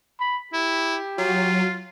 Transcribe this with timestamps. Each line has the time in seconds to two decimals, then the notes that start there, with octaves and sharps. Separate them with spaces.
0.20 B5
0.53 E4 G4
1.18 F#3 F4